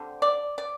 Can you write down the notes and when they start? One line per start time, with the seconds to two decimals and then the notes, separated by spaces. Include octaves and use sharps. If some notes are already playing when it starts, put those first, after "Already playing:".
Already playing: D3 G3 C4
0.22 D5
0.58 D5